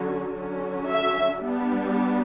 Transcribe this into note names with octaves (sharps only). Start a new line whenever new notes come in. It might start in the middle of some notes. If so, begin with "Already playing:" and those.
Already playing: D3 F#3 C#4
D3 F#3 C#4
E5
G3 B3 D4